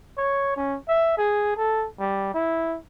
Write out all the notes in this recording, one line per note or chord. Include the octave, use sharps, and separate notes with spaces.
C#5
C#4
E5
G#4
A4
G3
E4